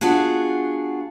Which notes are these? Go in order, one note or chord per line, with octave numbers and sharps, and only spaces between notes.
B3 D4 F4 F#4 G#4